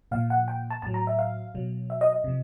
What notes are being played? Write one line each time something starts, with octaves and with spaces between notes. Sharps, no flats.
A#2 F3 F5
F#5
G5
A5
A2 F#3 A5
A#5
E5
F5
B2 F#3
E5
D#5
D#5
C3 F3